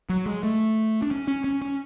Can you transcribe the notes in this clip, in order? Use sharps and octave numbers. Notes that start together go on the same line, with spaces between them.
F#3
G#3
A3
D4
C#4
C#4
C#4
C#4